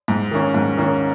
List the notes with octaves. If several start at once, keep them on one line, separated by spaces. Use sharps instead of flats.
G#2
D#3 A#3 C#4
G#2
D#3 A#3 C#4